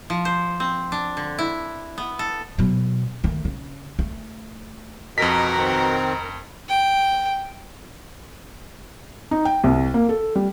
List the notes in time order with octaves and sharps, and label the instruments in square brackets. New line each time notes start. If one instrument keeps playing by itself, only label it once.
[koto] F3
C5
C4
D4
D3
E4
B3
A4
[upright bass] B2 F#3
D#3 A3
C#3
A3
[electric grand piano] F2 B6 [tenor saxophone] B2 [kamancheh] A#4 A#5 [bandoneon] D#5
[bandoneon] D#3 C4
[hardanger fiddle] G5
[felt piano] D#4
G5
C2
A#3
A4
G3